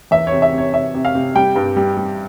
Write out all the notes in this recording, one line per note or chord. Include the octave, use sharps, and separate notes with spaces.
E2 E5
C#5
C3
E5
C3
C#5
C3 E5
C3
F5
C3
G3 G5
G2
G3
G3